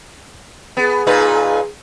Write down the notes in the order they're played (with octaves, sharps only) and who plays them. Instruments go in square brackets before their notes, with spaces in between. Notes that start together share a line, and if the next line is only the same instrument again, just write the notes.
[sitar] B3 [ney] G#4
[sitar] A#2 D#4 B4